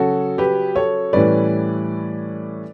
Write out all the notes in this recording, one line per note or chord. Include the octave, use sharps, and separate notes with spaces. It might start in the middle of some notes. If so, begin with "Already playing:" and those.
Already playing: C#3 F#3 C#4 F#4 A4
G4 B4
A4 C#5
A2 E3 G3 C#4 B4 D5